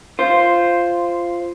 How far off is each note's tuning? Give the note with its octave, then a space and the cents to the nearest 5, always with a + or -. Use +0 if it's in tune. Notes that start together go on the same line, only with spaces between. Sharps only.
F4 -10 C5 +0